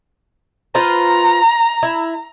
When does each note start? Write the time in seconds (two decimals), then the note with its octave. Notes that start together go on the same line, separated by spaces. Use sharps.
0.75 F4 B4 C5 A#5
1.83 E4